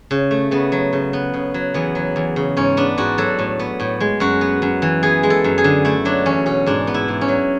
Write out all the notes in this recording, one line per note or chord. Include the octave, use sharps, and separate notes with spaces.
C#3
A3
C#3 B3
F#3
C#3
B3
C#3
F#3
E2 B3
F#3
E2
C#3
G#2 C#4
B3 D4
G#2 F#4
F#3 A4
A2
B3
A2
G#3
F#2 F#4
B3
F#2
E3
B3 G#4
G#3
A4
F#2
G#4
D3
A3 E4
F#3 D4
E2 C#4
B2 C#4
G#2 D4
B3
E4
G#2
C#4
F#3